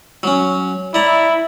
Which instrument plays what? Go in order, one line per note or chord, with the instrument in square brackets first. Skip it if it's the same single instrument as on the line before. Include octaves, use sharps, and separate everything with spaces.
[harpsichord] F#3 C#4
[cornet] E4 [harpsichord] D5 A#5